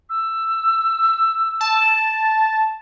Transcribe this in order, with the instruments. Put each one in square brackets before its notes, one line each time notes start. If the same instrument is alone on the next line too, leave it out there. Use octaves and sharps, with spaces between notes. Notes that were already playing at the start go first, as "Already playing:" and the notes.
[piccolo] E6
[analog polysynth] A5